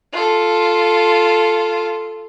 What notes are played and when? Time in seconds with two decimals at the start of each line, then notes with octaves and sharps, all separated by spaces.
0.12 F4 A4